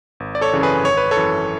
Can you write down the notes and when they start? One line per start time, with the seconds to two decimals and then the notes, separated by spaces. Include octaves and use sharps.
0.20 G#1
0.35 D5
0.41 A4 C#5
0.53 F#2 C#3 E3
0.63 G#4 B4
0.84 G#1 C#5
0.97 B4
1.11 A4 C#5
1.17 F#2 E3